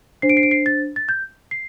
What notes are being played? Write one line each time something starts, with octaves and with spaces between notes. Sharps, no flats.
D4 C5 C7
D7
C7
D7
C7
A6
A6
G6
C7